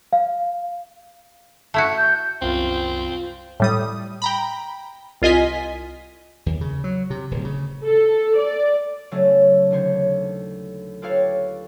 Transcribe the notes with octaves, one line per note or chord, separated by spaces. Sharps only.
F5
A3 E4 F#4
G6
C2 F#2 C4 F4
A2 G3 D#6
G5 A#5 B5
C2 F4 D#5 G#5 B6
D#2
C#3
F#3
C3
D1
C#3
A4
D5
C#3 F#3 A3 C#4 A4
D#2 D3 C5 C#5
F4 G4 A4 B4 C#5 F5